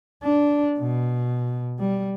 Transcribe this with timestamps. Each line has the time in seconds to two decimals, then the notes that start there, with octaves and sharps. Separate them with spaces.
0.23 D4
0.78 B2
1.79 G3